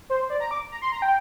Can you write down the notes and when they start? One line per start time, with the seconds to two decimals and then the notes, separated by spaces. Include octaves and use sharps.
0.10 C5
0.30 D5
0.40 A#5
0.51 D6
0.72 A#5
0.82 C6
0.92 A#5
1.02 G5